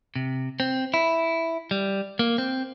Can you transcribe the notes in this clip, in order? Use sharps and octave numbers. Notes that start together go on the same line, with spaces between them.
C3
C4
E4
G3
A#3
C4